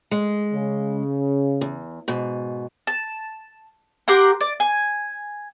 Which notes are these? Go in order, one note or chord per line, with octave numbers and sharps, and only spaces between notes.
G#3
C#3
E2
G#2 B2
A5
G4 A#4 F#5 C6
D5
G#5